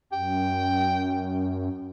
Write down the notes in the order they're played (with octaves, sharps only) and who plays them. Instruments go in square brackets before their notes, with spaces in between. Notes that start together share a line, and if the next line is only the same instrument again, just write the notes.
[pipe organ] F#2 [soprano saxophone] G5